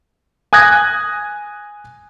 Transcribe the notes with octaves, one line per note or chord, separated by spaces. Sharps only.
G#5 D#6 F#6 G#6 A#6